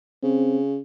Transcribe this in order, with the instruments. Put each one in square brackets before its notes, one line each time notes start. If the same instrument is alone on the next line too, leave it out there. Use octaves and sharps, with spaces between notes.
[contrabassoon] C#3 [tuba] C4